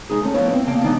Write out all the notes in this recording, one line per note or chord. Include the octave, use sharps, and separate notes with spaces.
G#3 D#4 G#4
A3 C#4
A2 F3 B3 E4 C#5 G5
C4 E4
E2 C#3 A#3 F5 G5 A5
E3 G3 G#3 B3 D4 D#4